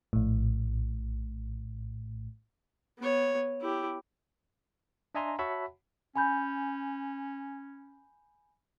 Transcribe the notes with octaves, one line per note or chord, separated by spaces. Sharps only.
A#1 A2
B3 C#5
E4 G4
D4 D#5 E5 G#5 A#5 C6
F#4 C#5 E5 F#5 A5 B5
C#4 G#5 B5 G6